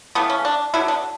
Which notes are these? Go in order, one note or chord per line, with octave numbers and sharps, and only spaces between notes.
C#3 E3 A3 B3
C#4
D4
D3 F#3 B3 E4
D4